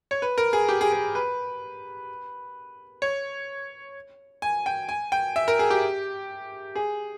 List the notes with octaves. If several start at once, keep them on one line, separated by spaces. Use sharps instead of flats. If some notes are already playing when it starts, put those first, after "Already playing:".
C#5
B4
A#4
G#4
G4
G#4
G#4
B4
C#5
G#5
G5
G#5
G5
E5
A#4
G#4
G4
G#4